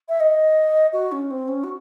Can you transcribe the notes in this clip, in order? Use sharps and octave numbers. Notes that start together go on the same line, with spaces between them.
E5
D#5
F#4
C#4
C4
C#4
F#4